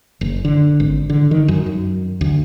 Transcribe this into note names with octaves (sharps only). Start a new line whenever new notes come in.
F#1
D3
G#1
D3
D#3
F#2
F#2
D2